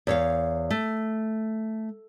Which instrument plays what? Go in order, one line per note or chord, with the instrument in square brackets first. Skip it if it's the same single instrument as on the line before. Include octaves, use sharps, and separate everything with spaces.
[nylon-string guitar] E2 C#5 F5
A3